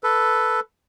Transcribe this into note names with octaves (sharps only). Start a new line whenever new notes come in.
A4 B4